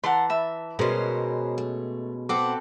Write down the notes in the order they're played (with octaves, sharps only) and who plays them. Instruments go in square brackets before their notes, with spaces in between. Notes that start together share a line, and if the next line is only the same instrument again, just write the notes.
[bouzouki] E3 A5 A#5 [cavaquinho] F#5 C6
[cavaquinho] E5 B5
[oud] B2 [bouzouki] G#3 C#4 [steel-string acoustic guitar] A#4 C5
[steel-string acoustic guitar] A3
[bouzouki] C4 A4 B4 [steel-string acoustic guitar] C5 F#5 [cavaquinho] D6